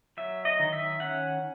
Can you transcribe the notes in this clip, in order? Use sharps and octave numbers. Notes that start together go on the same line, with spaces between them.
F#3 E5
D#5
D#3
E5
C#4 F#5